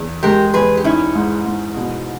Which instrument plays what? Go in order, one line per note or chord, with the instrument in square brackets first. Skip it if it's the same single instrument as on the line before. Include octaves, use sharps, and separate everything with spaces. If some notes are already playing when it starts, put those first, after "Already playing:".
Already playing: [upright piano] E2
[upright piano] G#3 [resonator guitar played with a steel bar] G4 A#4
[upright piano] E2 [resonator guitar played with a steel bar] G#4 B4
[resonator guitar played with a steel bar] G4
[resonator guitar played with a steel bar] C#4 E4 [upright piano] D#4
[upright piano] G#2
G#2
B2